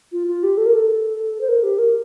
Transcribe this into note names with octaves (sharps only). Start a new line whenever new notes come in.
F4
F4
G4
A4
A#4
A4
C5
A#4
G4
A#4